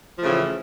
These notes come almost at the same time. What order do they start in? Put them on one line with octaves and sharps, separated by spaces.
F3 A2 C#3 E3